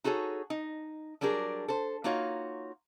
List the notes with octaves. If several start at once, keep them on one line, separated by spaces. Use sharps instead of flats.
D#4 F#4 G#4 A4 C#5
D#4
F#3 G3 D4 G#4 A#4
A4 C5
A#3 D#4 F4 F#4 C#5 F5